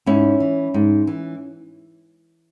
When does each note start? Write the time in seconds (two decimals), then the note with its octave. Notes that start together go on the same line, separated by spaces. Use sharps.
0.06 G#2 C#4 E4
0.40 E3
0.74 G#2
1.07 E3